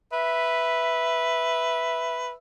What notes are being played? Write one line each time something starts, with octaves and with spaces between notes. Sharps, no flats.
B4 E5